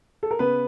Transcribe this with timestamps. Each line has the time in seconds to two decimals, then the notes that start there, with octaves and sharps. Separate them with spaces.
0.23 A4
0.31 A#4
0.39 C#3 B3 B4